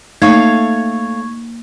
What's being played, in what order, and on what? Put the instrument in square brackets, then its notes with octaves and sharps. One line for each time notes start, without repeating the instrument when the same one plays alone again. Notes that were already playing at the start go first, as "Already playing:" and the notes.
[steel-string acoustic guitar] A3 C#5 F5 [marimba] A#3 [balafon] D#4 [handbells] C#6 G#6